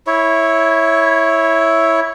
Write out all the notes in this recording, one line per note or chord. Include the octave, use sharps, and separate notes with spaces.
E4 C#5